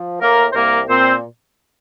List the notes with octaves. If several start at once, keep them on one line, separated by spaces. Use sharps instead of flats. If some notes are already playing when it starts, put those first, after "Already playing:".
Already playing: F3
A2 A#3 A#4
C5
C2 A#3 A#4
A#2 C4 C5